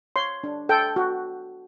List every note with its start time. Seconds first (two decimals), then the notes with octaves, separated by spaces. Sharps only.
0.16 C#5 C6
0.44 D4
0.69 A4 G5
0.96 F#4